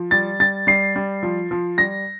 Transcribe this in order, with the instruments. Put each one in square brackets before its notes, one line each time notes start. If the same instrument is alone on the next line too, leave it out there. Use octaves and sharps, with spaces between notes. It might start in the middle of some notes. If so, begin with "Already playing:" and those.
Already playing: [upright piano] F3
G3 A6
G3 A6
G3 C7
G3
F3
F3
G3 A#6